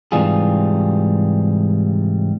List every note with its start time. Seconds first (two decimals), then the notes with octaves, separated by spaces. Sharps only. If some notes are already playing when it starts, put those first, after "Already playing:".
0.12 G#2 C3 E3 G3 F4 G#4